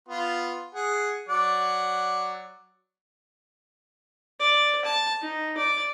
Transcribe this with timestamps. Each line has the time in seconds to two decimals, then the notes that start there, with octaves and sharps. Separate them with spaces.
0.09 B3 F4
0.75 G#4 F#5
1.29 F#3 D5 F#5
4.40 D5
4.85 A5
5.22 D#4
5.57 D5